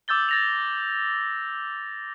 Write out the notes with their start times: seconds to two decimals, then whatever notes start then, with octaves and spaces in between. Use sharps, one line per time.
0.08 D6 E6 G6 A6 G7
0.29 A6 A#6 F7